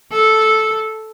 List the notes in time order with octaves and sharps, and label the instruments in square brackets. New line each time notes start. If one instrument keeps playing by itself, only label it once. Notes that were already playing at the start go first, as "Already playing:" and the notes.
[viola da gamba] A4